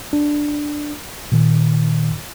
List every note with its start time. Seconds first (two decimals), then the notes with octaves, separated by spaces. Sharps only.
0.13 D4
1.32 A#2 D#3